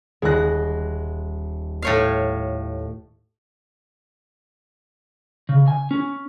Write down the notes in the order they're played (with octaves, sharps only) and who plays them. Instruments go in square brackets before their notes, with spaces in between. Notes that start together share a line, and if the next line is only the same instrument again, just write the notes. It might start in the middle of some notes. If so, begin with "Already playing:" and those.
[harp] D#1 A#6 [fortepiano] G#3 F#6
[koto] A2 C#5 F5
[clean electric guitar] C#3
G#5
C#4